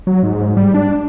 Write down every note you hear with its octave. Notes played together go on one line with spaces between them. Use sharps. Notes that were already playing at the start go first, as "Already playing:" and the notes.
F#3
G#2
G3
D4